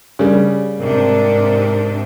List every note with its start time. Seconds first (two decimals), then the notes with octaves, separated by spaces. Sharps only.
0.19 C#3 G3
0.80 G#2 C3 D4 A#4